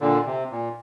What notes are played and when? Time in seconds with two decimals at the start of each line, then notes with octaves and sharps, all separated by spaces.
0.01 A#2 D3
0.26 C3
0.51 A#2